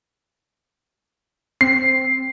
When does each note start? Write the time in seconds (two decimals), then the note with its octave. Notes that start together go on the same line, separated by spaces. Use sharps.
1.61 C4 C7